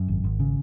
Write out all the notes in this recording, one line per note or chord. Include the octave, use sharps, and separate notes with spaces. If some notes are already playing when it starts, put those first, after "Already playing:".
Already playing: F#2
G#1
G#1
C#3